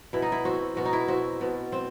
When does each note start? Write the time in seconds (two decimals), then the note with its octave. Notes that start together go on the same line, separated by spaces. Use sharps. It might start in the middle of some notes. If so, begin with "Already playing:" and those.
0.13 B2 E4
0.22 D#4
0.32 E4
0.45 C4 F#4
0.76 B2 F#4
0.85 D#4
0.93 E4
1.08 C4 F#4
1.41 B2
1.72 C4